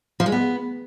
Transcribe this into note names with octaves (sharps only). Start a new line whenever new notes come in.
F3
G#3
B3